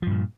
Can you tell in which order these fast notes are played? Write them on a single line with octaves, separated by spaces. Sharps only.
F3 G2 A#2